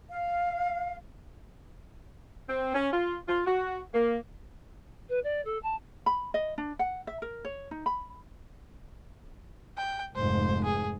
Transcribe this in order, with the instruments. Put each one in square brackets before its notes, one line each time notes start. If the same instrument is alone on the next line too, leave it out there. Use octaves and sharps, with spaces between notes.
[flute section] F5
[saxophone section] C4
C#4
F4
F4
F#4
A#3
[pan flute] B4
D5
A4
A5
[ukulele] B5
D#5
D4
F#5
E5
A#4
C#5
D#4
B5
[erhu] G5
[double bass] F1 G#2 [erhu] C5
[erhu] G#4